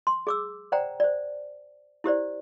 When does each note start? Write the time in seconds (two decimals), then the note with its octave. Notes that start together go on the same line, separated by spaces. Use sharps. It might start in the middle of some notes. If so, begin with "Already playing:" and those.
0.07 C6
0.27 G#4 D6 E6
0.72 C5 D5 F#5 G5 A#5
1.00 C5 D5
2.04 E4 G4 C5 D5